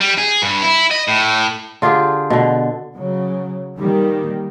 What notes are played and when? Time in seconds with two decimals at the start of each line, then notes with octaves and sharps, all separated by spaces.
0.01 G3
0.18 G#4
0.42 G2
0.62 E4
0.91 D#5
1.08 A2
1.82 D3 F4 G4 G#4
2.30 B2 D3
2.96 C#3 F#3
3.77 D#3 G3 A#3